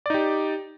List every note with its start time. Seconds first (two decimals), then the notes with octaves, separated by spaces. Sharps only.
0.06 D5
0.10 D#4
0.14 G4